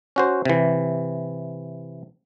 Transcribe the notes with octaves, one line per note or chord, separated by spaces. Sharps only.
C#4 F#4 C5
C3 E3